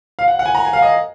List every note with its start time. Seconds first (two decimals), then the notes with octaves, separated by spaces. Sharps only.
0.19 F5
0.28 F#5
0.39 F#5
0.46 G#5
0.55 A#5
0.65 G#5
0.73 F5
0.82 D#5